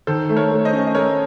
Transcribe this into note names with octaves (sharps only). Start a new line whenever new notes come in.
D#3 A4 C5
A3
A#4 C#5
A3
C5 D#5
C#4
D#5
A3 A#4 C#5